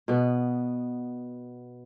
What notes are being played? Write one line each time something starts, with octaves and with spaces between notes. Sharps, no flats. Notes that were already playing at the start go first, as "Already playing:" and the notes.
B2 B3